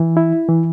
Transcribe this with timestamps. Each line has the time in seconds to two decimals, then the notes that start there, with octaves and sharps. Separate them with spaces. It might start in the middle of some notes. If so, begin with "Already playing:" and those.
Already playing: E3
0.17 E4
0.49 E3